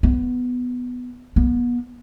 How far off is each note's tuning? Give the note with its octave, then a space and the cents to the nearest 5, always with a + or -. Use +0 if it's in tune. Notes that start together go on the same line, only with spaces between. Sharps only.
B3 +5
B3 -35